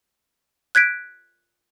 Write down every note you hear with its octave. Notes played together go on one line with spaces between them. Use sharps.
F#6 G#6 B6 D7